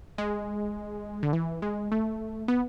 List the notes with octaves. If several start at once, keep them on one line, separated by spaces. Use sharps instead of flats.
G#3
D3
E3
G#3
A3
B3